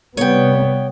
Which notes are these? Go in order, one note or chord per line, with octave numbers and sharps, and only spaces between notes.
C3 G3 B3 C#5 G5